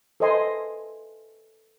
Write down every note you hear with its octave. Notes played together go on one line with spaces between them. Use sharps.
A4 B4 C5 D#5 G#5 C6